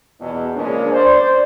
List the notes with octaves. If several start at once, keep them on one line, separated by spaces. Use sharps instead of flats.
E2 B2
C#3 F3 G#3 A#3 C#4 D4
C5 D5